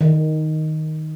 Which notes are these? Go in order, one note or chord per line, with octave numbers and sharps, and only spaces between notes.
D#3